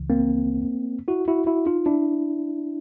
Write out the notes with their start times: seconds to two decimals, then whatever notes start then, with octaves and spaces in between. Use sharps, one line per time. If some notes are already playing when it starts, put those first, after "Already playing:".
Already playing: C#2 C#3 E3
0.10 A#3 C4
1.08 E4 F#4
1.28 E4 F#4
1.46 E4 F#4
1.66 D#4 F4
1.86 D4 E4